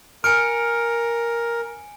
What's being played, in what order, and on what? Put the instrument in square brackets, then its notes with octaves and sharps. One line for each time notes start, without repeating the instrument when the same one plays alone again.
[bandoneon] A#4 [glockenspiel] G#5 C#7 D7 [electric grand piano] F6